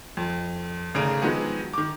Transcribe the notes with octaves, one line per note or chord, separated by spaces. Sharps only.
F2
G#1 C#3 A3 G#4 A#5 D7
D#3 F3 F#3 G#3 B3 G#4
D#3 D6